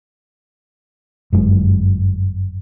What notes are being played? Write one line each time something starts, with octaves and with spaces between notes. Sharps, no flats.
G1 F#2 G#3